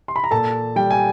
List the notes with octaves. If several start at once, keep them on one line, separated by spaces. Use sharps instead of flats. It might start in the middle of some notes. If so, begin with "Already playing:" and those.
C6
B5
A#5
A#2 A4 A5
G3 G5
G#5